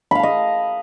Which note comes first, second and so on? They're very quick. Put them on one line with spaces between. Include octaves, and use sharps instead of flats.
B5 F5 A5 D#5